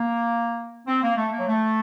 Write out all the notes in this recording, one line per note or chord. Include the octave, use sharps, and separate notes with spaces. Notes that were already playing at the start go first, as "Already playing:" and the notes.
Already playing: A#3
C4
A#3
A3
A#3
F#3
A3